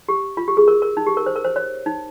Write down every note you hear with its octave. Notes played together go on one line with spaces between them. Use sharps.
G4
F4
G4
G#4
A#4
A#4
D#4
G4
A#4
C5
A#4
C5
C#5
D#4